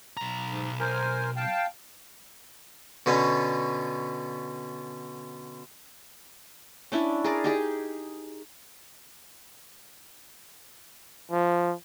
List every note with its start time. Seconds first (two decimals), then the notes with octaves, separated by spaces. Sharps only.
0.17 B1 A#5
0.50 G#2
0.80 A#4 C5 G#5
1.36 F5 G5 A5
3.06 B2 D3 B3 C#4
6.92 C#4 D4 E4
7.24 G#4 A#4 D5
7.44 D#4 G4 G#4
11.32 F3